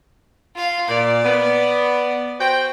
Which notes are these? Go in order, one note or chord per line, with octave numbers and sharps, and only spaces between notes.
F4 F5
A#2 D5
B3
F#4 C5 G5